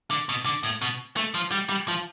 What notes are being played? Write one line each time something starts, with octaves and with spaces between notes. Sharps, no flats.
D3
B2
D3
A2
B2
A3
F3
G3
G3
F3